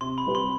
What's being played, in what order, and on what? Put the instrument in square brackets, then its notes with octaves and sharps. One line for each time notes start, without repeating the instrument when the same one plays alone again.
[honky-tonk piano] C3 [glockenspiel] C6
[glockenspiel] B5
[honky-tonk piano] G3 C4 G4 B4
[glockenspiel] C6